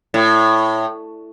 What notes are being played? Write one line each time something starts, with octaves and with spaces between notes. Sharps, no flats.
A2